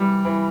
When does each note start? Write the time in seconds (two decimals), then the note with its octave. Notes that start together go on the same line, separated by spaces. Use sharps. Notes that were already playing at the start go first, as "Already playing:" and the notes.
Already playing: E3 G3
0.25 E3